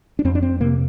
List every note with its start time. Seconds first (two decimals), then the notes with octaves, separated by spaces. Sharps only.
0.19 D4
0.25 F2 C4
0.35 D4
0.43 C4
0.61 C3 A#3